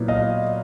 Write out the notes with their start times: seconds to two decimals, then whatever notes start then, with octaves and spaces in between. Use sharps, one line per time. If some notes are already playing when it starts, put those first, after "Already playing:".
Already playing: A#2 F#3 B3 E4
0.08 D#5 F5